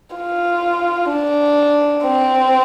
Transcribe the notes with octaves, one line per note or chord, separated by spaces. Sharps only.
F4
D4
C4